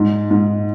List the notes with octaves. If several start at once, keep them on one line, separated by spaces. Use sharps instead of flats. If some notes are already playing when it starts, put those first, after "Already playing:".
Already playing: G#2
G#2